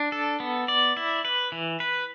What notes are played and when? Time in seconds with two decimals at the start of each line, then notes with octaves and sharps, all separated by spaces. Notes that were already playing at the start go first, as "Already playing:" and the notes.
Already playing: D4
0.12 A4
0.40 B3
0.68 D5
0.97 E4
1.25 B4
1.52 E3
1.80 B4